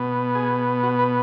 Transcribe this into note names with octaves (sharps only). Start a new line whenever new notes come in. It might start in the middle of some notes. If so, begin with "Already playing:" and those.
Already playing: B2 B3
G#4
F#4
B4